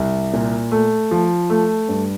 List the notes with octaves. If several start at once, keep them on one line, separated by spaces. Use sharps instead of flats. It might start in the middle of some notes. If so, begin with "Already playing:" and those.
Already playing: C2
A#2
A3
F3
A3
G2